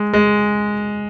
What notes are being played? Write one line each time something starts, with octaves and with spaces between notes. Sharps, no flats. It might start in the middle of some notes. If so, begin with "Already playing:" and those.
Already playing: G#3
G#3